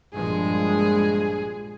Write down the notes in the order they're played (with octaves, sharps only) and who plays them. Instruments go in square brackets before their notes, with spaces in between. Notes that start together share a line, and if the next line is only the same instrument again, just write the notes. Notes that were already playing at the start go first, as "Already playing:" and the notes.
[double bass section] A#1 F3 G#3 [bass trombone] G2 [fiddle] G#4